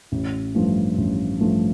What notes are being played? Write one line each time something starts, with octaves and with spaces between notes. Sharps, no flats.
A1
G2 F3 A3
A1
G2 F3 A3